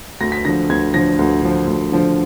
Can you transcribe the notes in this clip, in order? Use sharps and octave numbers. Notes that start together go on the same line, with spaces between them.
D2 A#6
B6
D3 F3 A#6
D2 G#6
D3 F3 A#6
D2
D3 F3
D2
D3 F3